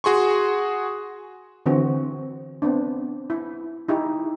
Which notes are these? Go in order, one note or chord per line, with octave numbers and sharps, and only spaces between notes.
F#4 G#4 C6 C#6
D3 E3 C4 F#4
B3 C4 D4
E4
D#4 E4 G4